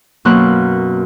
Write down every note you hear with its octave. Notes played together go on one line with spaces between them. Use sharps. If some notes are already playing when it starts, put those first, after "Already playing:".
F#2 B2 F#3 A#3 C6 F#6